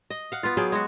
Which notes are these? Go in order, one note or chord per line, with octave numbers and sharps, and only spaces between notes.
D#5
F5 F#5
B3 F4
F#3 G#4 F5 G5
G#3 F#4